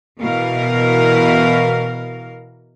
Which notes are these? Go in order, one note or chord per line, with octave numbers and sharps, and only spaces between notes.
B2 E3 A#4 F5